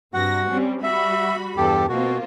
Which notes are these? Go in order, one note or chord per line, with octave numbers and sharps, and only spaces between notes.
G2 C3 F#4 F#5 A#6
G3 C4 C#4
G3 F#4 E5 B5
E2 G2 G4 A4
B2 A#3 C4 F4 F#4